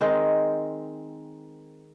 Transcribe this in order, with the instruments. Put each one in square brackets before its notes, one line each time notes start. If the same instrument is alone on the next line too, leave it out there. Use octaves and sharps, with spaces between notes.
[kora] D#3 G#3 C4